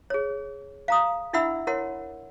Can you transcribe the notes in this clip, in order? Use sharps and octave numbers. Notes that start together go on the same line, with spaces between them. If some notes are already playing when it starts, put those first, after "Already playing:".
G#4 C#5
F5 A#5 D#6
D4 E4 E5 F#5 B5 E6
E4 A#4 C#5 F#5 C6